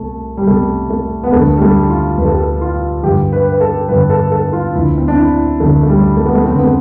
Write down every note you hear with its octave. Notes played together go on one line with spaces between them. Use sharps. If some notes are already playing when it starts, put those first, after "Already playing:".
Already playing: C2 B2 A3
G3
C2 B2 A3
A3
B3
D2 D3 F3 A3
G3
A3
F4
D2 D3 F3 B4
A4
G4
A4
F4
G2 D3 F3 G4
B4
B4
A4
G2 D3 F3 B4
A4
A4
F4
D2 D3 F3 E4
C4
D4
E4
D2 D3 F3 A3
A3
G3
A3
B3
A3
F2 D3 F3 C4
B3
A3